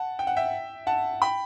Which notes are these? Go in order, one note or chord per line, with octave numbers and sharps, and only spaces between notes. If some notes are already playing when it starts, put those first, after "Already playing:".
Already playing: F#5 A5
G5
F#5
E5 G5
F#5 A5
G5 B5